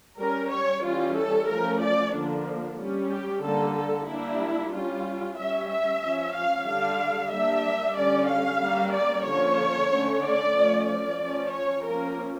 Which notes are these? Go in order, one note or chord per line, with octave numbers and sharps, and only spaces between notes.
G3 C#4 A#4
C#5
E3 G3 C#4 F4
A4
F3 A3 C#4 A#4
D5
D3 F3 A#3 D4
G3 C#4
G4
D3 G3 A#3 A4
A4
G3 A#3 D4 E4
G3 C#4 F4
G3 C#4 E5
E5
F3 C#4
F5
D3 G3 D4 F5
G3 A#3 D4 E5
D3 G3 C#4 D5
F5
G3 A#3 C#4
D5
D3 F3 A#3 C#4 C#5
D3 A3 C#4
D5
F3 A3 C#4
D5
F3 C#4
C#5
F3 A#3 C#4 A#4